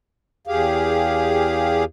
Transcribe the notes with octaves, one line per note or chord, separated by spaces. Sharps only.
E2 G4 G#4 F5